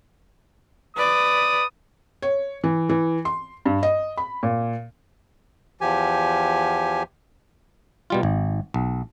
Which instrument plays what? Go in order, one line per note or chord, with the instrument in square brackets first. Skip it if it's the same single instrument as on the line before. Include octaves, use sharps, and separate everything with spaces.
[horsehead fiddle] B4 D5 [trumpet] D#6
[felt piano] C#5
E3
E3
C6
G2
D#5
B5
A#2
[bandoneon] E2 F3 G4 G#5
[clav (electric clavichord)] B2 G3 F4
G#1
B1